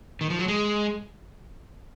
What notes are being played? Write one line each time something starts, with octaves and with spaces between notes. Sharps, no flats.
D#3
F3
F#3
G#3